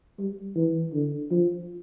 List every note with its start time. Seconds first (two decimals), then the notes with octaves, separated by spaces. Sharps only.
0.19 G3
0.56 E3
0.93 D3
1.31 F3